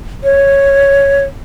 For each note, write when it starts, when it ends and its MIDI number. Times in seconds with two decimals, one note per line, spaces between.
0.24 1.23 73